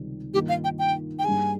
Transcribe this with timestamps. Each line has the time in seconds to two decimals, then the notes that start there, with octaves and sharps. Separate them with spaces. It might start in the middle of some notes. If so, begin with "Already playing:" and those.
Already playing: C#2 C3 D#3 G3
0.34 G2 D#3 A#3 F4 G4
0.49 F5
0.64 G5
0.79 G5
1.19 G5
1.24 G2 G3 A#3 D#4 G#4 G#5